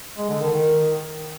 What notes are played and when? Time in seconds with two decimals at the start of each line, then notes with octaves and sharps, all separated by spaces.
0.17 G#3
0.29 D3
0.40 D#3
0.52 D#3